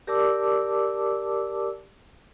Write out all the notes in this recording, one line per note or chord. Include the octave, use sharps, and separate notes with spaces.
G4 A#4 D5 A5 D6 E6